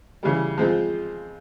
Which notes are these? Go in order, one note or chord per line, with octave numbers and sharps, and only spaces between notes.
C#3 E3 G3
F3 G#3 C4 F4